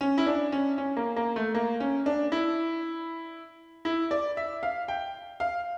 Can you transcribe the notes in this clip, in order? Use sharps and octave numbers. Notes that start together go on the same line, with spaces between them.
C#4
E4
D4
C#4
C#4
A#3
A#3
A3
A#3
C#4
D4
E4
E4
D5
E5
F5
G5
F5